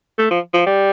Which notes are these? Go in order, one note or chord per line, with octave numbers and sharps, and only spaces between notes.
A3
F3
F3
G3